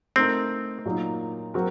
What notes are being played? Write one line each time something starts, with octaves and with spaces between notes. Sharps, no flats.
A3 C4 D#4 A#4
A#2 F#3 A#3 D#4
F#3 C4 F#4 A#4